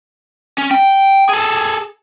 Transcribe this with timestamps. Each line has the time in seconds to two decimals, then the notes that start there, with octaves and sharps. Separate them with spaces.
0.58 C#4
0.71 G5
1.29 G#4 A4